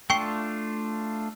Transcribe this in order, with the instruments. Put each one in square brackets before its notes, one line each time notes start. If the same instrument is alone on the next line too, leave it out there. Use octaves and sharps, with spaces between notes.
[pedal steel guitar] A3 D4 F4 [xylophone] G5 C#6 C7